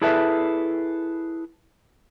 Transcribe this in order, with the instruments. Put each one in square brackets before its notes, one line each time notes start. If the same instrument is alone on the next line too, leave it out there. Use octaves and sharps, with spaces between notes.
[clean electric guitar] E4 G#4 A4 B4 E5